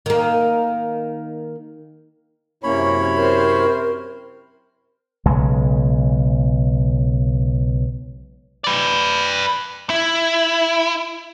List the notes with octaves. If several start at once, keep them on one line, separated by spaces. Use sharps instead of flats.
D#3 A#3
F#2 C3 A#3 C#4 E4 C#5 B5
C4 A#4 C5
B1 C#3 G#3
B4 D5
E4